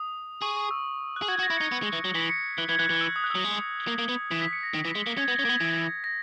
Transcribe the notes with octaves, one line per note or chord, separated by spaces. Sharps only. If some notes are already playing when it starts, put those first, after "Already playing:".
Already playing: D#6
G#4 C#6
C#6
E6
F#6
G#4
F#4 G#6
F#4
A#6
E4
D#4 C#7
B3
G#3
E3
F#3
E3 B6
C#7
E3 F#6
E3 G#6
E3 F#6
E3
E6
D#6
F#6
F#3 E6
G#3
A#3
A#3
B3
E3 B6
B6
C#7
A#6
D#3
E3
G#3
A#3
C#4 G#6
B3 A#6
C#4
A#3 G#6
B3
E3
A#6